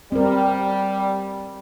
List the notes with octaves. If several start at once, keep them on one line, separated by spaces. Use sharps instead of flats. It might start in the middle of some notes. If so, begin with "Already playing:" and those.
G3 C4 A#4